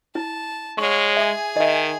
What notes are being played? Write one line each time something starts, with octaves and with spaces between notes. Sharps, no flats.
E4 A5
G#3 C#5 F5 C#6
G#4 E5 G#5
D#3 D#5 E5